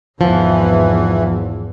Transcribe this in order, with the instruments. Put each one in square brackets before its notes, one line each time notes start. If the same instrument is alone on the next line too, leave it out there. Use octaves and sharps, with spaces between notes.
[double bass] G#1 E2 [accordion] E3 [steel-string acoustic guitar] F3